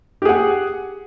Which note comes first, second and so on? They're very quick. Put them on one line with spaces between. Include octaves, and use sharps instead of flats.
G4 G#4 F#5